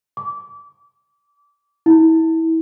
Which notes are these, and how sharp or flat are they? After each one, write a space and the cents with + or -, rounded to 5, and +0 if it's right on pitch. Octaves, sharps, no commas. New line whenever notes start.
D6 -25
E4 -25